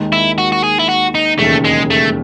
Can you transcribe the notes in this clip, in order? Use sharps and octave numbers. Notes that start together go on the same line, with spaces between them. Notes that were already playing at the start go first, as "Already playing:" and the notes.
Already playing: D#2 D#3 G#3
E4
F#4
F#4
G#4
E4
F#4
D#4
E1 D#2 C#3 A3
G#3
A3